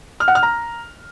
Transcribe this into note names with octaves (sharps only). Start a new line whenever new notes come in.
F6
F#5
F6
A#5